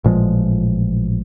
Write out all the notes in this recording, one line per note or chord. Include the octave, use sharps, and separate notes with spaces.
A1 A#2 F3 G#3